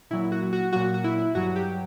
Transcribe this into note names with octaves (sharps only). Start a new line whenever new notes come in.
A#2 F#3 E4
F#4
F#4
A#2 F#3 F#4
F#4
E4
G2 F#3 F#4
G4